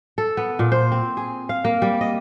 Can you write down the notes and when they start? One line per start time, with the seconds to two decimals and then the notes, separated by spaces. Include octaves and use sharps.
0.18 A4
0.37 B3
0.59 A#2
0.72 C5
0.92 C4
1.17 G#4
1.49 F5
1.65 A#3
1.82 G3
2.01 D#5